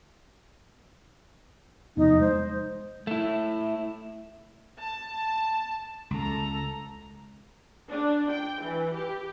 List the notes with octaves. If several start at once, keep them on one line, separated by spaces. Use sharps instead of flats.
E2 C3 F3 D#4
G#3 C5
A3 E4
A5
C#2 A4 A#5
D4
G5
E3
G4